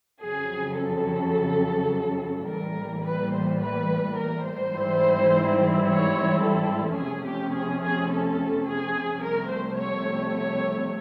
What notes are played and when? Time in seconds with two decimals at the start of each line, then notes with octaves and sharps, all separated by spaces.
0.22 F2 C#3 F#3 G#4
0.78 A4
2.47 A1 A2 E3 G3 A#3 A#4
3.03 B4
3.32 C5
3.60 B4
4.16 A#4
4.44 C5
4.72 G#2 E3 G3 C4 E4
5.85 C#5
6.41 A4
6.97 F2 C3 F3 A3 C#4 G#4
7.26 G4
7.54 G#4
7.82 G#4
8.10 A4
8.67 G#4
9.23 C2 C3 F3 A3 A#4
9.51 C5
9.79 C#5
10.35 C#5